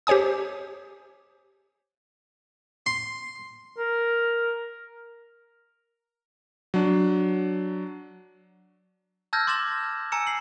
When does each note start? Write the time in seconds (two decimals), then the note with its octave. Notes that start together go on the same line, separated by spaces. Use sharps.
0.07 G4 C5 C#5 G#5 D#6
2.86 C6
3.78 A#4
6.74 F#3 D4
9.33 A5 E6 F6 G6 G#6 A#6
9.47 C6 D6 A6 E7 F#7
10.12 G#5 A#5 E6 C#7 E7
10.27 C7 F#7